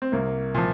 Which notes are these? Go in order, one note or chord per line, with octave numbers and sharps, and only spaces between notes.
C4
C2 A#3
A#2 F3